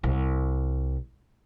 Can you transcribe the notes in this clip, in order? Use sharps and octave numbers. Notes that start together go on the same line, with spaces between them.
C2